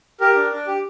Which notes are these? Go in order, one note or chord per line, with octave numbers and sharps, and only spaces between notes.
G4 A#4
D4
D4
G4